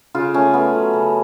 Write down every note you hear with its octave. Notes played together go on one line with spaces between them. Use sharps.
C#3 F4
A3 C#4
A3 B3
F#3
C#3